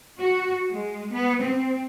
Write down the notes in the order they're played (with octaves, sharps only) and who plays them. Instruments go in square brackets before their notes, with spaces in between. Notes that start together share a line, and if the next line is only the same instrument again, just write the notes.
[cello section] F#4
G#3
B3
C4